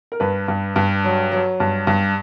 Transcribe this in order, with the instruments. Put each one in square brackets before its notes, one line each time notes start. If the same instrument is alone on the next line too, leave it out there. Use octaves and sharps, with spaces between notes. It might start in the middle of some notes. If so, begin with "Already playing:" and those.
[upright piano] A#4
G2 B4
G2
G2
F#3
F#3
G2
G2